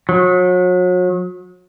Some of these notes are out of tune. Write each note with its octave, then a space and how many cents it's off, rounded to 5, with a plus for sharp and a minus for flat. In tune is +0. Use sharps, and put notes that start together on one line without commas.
F#3 -35